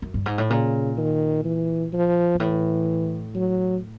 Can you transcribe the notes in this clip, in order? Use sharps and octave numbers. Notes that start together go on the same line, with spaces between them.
F#2
G2
G#2
A2
A#2 C#3
D#3
E3
F3
G#2
A2 E3
F#3